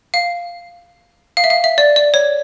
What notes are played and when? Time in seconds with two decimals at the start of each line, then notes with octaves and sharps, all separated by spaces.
0.14 F5
1.37 F5
1.44 E5
1.50 F5
1.64 E5
1.78 D5
1.96 D5
2.14 C#5